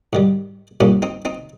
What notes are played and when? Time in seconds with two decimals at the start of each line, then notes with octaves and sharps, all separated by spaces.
0.13 G#2 D#3 G3
0.80 A#1 G#2 G3 A#3 C#4
1.02 C4 D#4
1.25 C4 D#4